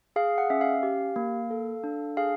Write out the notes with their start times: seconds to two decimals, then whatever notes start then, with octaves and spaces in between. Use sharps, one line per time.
0.16 G#4 F5
0.38 F#5
0.50 C#4 E5
0.61 F5
0.83 G4
1.16 A#3
1.51 A4
1.84 D4
2.17 G#4 F5